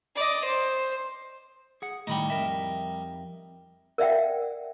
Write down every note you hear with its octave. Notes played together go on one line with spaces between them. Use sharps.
D5 D#5
C5
G#4 F#5
A2 D#3 G3 D#4 B5
F2 A#4 E5
A#4 D5 E5 F#5 G5